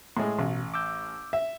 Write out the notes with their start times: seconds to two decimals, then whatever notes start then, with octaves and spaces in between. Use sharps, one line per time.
0.17 A2 G#3
0.39 A1 B2
0.74 D6 E6 G6
1.33 E5